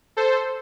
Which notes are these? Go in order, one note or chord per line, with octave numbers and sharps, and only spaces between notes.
A4 C5